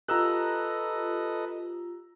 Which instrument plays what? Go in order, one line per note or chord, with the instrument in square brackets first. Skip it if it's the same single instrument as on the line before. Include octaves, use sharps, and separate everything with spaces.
[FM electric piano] F4 G4 [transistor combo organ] A4 B4 D#5 [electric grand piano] A#5 E6 F#6